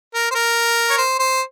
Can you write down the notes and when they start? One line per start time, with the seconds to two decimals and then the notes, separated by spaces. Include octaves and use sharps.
0.14 A#4
0.31 C5
0.35 A#4
0.90 C#5
0.98 C5
1.19 C5